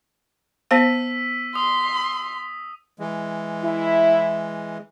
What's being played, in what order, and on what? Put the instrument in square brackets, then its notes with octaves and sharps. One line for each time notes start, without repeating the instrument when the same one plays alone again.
[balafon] B3 C5 F5 [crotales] E6 B6 D#7
[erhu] C6 [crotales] D#6
[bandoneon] E3 G#3
[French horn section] E4